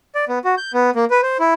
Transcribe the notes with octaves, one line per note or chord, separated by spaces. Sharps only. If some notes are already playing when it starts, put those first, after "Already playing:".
D5
B3
F#4
G6
B3
A#3
B4
C5
E4